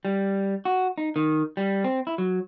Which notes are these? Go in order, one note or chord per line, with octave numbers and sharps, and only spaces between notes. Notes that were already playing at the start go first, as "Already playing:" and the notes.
G3
F#4
D#4
D#3
G3
C4
E4
F#3